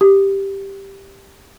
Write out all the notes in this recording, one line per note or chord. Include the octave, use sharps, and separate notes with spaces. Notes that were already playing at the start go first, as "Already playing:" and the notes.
G4